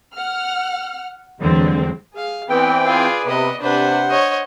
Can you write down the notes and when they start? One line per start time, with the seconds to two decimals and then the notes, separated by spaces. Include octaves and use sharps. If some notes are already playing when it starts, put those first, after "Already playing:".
0.14 F#5 F6
1.39 E2 G2 D3 F#3 G#3 C4
2.13 G#4 F5
2.49 E3 B3 C4 B4 D5 G5
2.86 F4 G#4
3.25 C3 B3 D#5
3.61 C3 D4 B4 C5 F#5
4.10 C#5 D#5